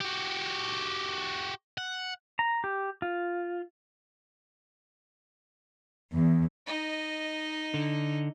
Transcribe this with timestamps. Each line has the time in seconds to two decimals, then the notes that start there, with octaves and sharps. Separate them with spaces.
0.01 F#4 G4
1.78 F#5
2.39 A#5
2.64 G4
3.02 F4
6.13 E2
6.66 D#4 D#5
7.74 D3